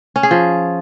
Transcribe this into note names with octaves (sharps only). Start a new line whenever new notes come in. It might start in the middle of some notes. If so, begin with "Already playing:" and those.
C#4
G#4
F3